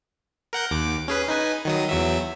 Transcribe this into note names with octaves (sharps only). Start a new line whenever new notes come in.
A#4 F#5 G6
D#2 D6
C#4 G#4 B4
D#4 B4 G#5
D#3 F#3 D#6
E2 F#3 E5